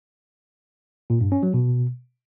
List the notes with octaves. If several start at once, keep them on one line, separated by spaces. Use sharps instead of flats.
A#2
G2
C#4
F#3
B2